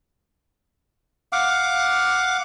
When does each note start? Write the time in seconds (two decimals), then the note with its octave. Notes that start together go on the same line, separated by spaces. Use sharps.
1.33 F5 F#5 D6